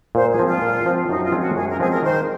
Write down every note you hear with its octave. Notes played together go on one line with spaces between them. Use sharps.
A#2 C5
G#4
F3 C4
F4
A#2
F3 C4
F#2 D#4
F4
F3 G#3 C4
F#4
F#2 G#4
A#4
F3 G#3 C4 G#4
A#4
D#3 C5